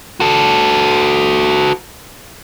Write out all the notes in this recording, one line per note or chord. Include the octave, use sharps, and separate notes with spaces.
F#4 A4